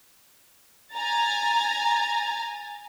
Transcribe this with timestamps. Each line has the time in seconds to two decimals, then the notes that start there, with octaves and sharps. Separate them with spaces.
0.94 G#5 A#5 A6